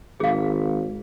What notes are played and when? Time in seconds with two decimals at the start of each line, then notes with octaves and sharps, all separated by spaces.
0.20 G#1 G#4 F5